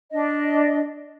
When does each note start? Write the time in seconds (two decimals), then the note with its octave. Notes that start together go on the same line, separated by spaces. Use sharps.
0.12 D4 D#5